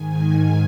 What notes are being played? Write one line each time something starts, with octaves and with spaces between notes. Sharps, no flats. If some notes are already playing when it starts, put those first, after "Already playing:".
Already playing: G#2 D#3 G#5